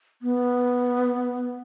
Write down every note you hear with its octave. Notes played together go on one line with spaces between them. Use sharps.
B3